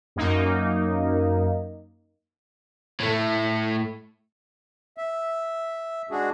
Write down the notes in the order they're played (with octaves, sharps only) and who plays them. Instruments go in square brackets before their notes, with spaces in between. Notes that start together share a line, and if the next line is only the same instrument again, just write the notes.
[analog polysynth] F#2 A#3 D#4
[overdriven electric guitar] A2 A3
[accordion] E5
G#3 D4 F#4 G#4